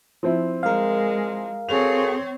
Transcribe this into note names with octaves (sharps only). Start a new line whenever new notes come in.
F3 C4 E4
G#3 A#4 F5
C4 F#4 G#4 A4 C#5 F7